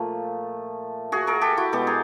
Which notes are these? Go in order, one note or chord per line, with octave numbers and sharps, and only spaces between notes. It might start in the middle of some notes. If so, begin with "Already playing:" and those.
Already playing: A#2 F3 A3
F#4 G#4
G#4 A#4
G4 A4
E4 F#4
B2 G#3 B3 G4 A4
G#4 A#4